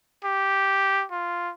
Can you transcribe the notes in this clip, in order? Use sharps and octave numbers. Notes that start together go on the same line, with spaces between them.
G4
F4